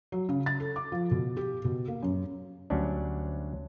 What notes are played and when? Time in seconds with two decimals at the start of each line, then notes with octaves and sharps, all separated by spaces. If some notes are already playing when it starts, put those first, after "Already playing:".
0.12 F#3
0.29 C#3
0.46 A6
0.60 A4
0.76 D6
0.92 F3
1.11 B2
1.37 G4
1.64 B2
1.88 A#3
2.02 F#2
2.70 D2 F#3 G3 C#4 D4